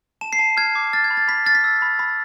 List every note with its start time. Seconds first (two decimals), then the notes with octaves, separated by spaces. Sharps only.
0.21 A5 E7
0.33 C7
0.39 A5
0.57 F6 G#6
0.75 D6
0.93 F6 A6
1.04 G#6
1.10 B5
1.17 A6
1.28 B5 B6
1.46 F6 A6
1.55 B6
1.64 E6
1.82 B5
1.99 B5